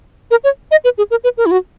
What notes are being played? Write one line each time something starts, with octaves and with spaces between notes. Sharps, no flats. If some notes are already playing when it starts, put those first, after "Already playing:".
A#4
C#5
D#5
B4
G#4
A#4
B4
A#4
E4
F#4